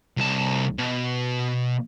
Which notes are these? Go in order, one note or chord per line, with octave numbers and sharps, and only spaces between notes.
C2 A5
B2